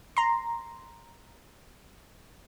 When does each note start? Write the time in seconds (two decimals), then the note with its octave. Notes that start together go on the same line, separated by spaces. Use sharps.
0.17 A#5 C6